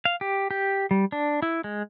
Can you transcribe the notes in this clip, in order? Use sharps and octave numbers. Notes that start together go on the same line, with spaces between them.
F5
G4
G4
G3
D4
E4
G#3